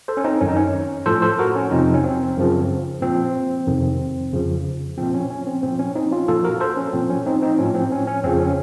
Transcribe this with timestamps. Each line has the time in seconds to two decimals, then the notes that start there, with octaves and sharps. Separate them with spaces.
0.08 A4 C5
0.17 C#4
0.24 C4 D#4
0.41 F#2 D#3 C#4
0.49 D#4
0.56 C#4
1.06 A2 F3 A4 C5
1.22 A4 C5
1.39 F#4 A#4
1.56 C#4
1.71 F2 C3 F3 C4 D#4
1.94 C#4
2.04 C4
2.37 F#2 C#3 F3
3.02 A#2 F3 C4
3.67 F2 C3 D#3
4.33 F2 C#3 F3
4.98 A#2 F3 C4
5.14 C#4
5.30 C#4
5.47 C4
5.63 A#2 F3 C4
5.79 C#4
5.95 C4 D#4
6.12 C#4 F4
6.28 A#2 F3 F4 A4
6.44 F#4 A#4
6.60 A4 C5
6.77 C#4
6.93 A#2 F3 C4
7.10 C#4
7.26 C4 D#4
7.42 C4 D#4
7.58 A2 F3 C#4
7.75 C4
7.92 C#4
8.07 C#4
8.24 F2 C#3 F3 C4
8.40 C#4